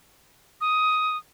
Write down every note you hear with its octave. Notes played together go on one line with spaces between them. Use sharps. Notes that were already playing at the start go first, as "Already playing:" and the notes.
D#6